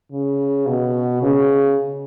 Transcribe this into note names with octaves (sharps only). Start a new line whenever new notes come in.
C#3
B2
C#3